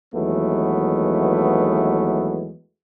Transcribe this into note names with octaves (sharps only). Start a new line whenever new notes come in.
D#2 E3 F#3 G#3 A3 B3